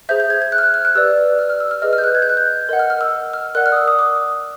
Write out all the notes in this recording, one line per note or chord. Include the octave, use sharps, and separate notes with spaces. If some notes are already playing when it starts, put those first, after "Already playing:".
G#4 C5 E5 G6
G6
G#6
G#6
F#6
F6
F#6
F6
F#6
G4 B4 D5 E6
F6
F6
E6
F6
G#4 B4 D#5 F6
F6
G6
F#6
G#6
G6
F#6
G6
A#4 D#5 F#5
F6
F6
E6
F6
F6
A#4 D5 F#5 F#6
F6
D#6
E6
D#6
D6